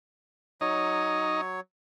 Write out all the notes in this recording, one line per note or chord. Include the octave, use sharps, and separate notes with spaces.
F#3 D#4 C#5 D#5